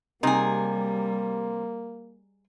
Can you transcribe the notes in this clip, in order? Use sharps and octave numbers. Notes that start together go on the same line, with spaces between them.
C3 G3 A#3 D#4 G#4